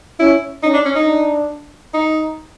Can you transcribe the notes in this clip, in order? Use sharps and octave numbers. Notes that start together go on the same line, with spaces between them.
C#4 E4
C#4 D#4
D4
C#4
D#4
D4
D#4